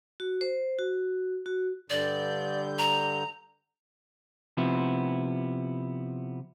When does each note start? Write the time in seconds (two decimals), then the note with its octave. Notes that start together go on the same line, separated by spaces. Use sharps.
0.20 F#4
0.41 C5
0.79 F#4
1.46 F#4
1.90 G2 D3 D5 G6
2.78 A#5
4.57 C3 F3 B3 E4